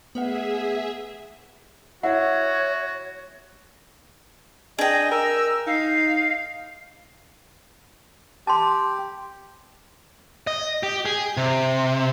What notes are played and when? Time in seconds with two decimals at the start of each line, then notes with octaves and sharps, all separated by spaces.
0.15 A3 B3 G#4 B4 E5 F#5
2.03 E4 F#4 C#5 F#5
4.79 D4 G#4 D#5 G5
5.11 A#4 E6
5.67 D#4 F5
8.47 G4 A5 C6
10.47 D#5
10.83 G4
11.05 G#4
11.37 C3